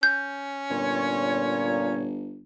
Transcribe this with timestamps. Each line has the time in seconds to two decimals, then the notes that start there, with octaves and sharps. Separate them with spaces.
0.03 C#4 G6
0.70 G1 A#2 C#5